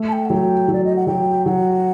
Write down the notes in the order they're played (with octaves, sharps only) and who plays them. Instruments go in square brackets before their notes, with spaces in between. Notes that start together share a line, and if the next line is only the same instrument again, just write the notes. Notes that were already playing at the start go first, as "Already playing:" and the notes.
Already playing: [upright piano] A3
[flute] A5
G5
F#5
[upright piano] F#3 [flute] G5
[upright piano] F#3 [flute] D5
[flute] D#5
F#5
[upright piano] F#3 [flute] G5
[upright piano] F#3 [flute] F#5